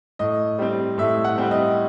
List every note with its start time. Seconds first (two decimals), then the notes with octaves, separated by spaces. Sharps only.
0.19 A2 D#5
0.59 G3 C4
0.98 A2 E5
1.24 F#5
1.38 G3 C4
1.51 D#5